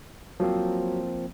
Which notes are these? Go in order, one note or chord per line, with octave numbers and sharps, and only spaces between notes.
F3 F#3 A#3 C4